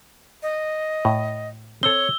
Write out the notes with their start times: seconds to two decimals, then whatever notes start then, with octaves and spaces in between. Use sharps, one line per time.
0.43 D#5
1.05 A2
1.83 C4 A4 C#5 E6 G7